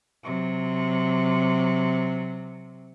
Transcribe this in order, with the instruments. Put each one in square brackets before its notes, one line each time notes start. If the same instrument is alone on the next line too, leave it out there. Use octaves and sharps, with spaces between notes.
[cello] C3 F#3